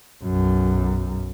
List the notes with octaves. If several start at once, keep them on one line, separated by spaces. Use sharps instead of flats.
B1 F#2